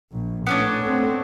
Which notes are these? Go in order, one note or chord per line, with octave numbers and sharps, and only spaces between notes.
A#1
A2 B3 C#4 D4
A3 C4